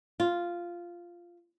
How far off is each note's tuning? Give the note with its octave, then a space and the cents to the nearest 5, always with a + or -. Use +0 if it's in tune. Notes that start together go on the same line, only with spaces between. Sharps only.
F4 -5